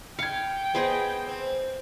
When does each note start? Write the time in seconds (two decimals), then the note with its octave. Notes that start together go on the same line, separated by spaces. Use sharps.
0.19 F5 G5 G#6 C#7
0.75 B3 G#4 C5 D#5
1.27 C4